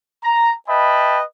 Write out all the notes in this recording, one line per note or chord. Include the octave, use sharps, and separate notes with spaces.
A#5
B4 D#5 E5 G5 A5 B5